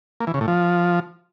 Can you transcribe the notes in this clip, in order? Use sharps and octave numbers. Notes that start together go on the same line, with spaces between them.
A#3
E3
C#3
A2
F3